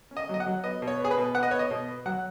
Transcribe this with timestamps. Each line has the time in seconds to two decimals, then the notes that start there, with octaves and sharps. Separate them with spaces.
0.11 C#4
0.17 D#5
0.29 F#3 D#5
0.40 F#5
0.46 F#3
0.64 B3 D#5
0.82 B2
0.88 C#5
1.00 B3 G#4
1.11 B4
1.17 B2
1.35 B3 F#5
1.43 D#5
1.51 B3 C#5
1.59 D#5
1.71 B2
1.88 B3
2.06 F#3 F#5